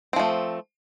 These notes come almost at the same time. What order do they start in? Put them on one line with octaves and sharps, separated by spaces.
C4 F3 A3